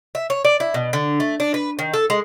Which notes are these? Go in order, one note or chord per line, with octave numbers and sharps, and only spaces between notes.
E5
C#5
D5
E4
B2
D3
A3
D4
B4
D#3
A4
G#3